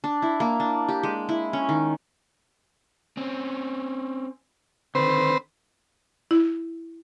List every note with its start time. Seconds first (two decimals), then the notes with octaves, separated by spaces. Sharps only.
0.04 D4
0.22 E4
0.40 A#3
0.60 D4
0.89 G4
1.03 G#3
1.29 E4
1.53 C#4
1.69 D#3
3.17 C4 C#4
4.95 D3 D#3 C4 B4 C5
6.31 E4